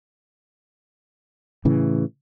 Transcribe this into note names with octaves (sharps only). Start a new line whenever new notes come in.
A2 C#3 E3